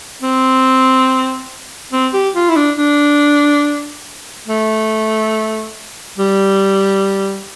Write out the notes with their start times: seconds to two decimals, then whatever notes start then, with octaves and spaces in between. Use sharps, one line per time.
0.22 C4
1.93 C4
2.14 G4
2.35 F4
2.49 E4
2.56 D4
2.78 D4
4.48 A3
6.18 G3